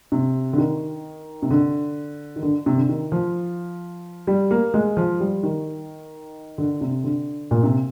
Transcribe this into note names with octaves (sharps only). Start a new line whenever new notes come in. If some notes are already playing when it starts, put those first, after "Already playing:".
C3
D3
D#3
C3
D3
D#3
D3
C3
D3
D#3
F3
G3
A#3
G#3
F3
G3
D#3
D3
C3
D3
A#2
C3